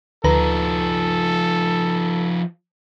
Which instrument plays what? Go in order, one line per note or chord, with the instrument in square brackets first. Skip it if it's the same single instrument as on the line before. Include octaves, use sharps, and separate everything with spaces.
[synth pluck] D2 B4 A#5 [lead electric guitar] F3 D#4 [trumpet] A4